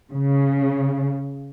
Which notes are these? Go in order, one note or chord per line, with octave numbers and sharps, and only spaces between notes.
C#3